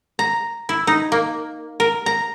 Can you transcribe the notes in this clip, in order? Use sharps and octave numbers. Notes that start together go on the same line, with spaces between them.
A#5
E4
D#4
A#3
A#4
A#5